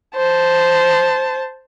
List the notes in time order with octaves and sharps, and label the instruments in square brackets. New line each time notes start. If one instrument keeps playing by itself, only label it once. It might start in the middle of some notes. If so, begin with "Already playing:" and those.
[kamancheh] C5 A5